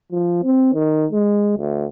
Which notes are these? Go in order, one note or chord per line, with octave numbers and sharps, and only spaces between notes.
F3
C4
D#3
G#3
D2